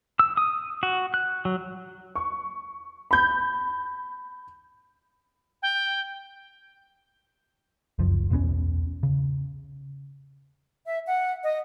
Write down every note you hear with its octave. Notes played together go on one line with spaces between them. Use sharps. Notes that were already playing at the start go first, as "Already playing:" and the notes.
E6
D#6
F#4
F#6
F#3
C#6
B5 G6
G5
F1 C#2 F#2 F3
B1 E2 B3 C#4
C#3
E5
F#5
D#5